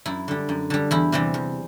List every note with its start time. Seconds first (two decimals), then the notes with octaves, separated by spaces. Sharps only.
0.06 F#2 E4
0.28 D3 G3
0.49 F#2
0.70 D3 G3
0.91 E2 E4
1.12 C3 E3 G3
1.34 E2